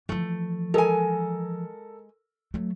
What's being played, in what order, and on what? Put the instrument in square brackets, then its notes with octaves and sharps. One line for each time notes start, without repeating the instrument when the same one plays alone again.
[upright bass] E3 F3 [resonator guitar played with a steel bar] A3
[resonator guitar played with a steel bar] G#3 G#5 [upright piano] A4 A#4
[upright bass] F#3 A3